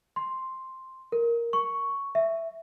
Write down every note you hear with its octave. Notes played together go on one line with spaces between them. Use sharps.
C6
A#4
C#6
E5